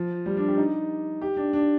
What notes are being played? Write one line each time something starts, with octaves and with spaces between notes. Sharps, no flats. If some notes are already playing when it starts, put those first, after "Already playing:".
Already playing: F3
G3
D4
G4
D#4
G4
D4
D4